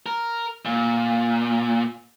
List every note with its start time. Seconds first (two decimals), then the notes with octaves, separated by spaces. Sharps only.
0.06 A#4
0.65 A#2